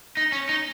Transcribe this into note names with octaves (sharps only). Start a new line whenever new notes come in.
D#4
C#4
D#4